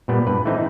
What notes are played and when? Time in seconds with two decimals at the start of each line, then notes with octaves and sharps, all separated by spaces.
0.08 A#2 G3 B3
0.27 G2 B4
0.45 E3 A3 C4 D#4